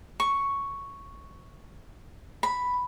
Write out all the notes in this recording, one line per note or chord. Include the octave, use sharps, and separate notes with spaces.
C#6
B5